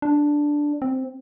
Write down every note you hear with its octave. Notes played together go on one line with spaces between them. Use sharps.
D4
C4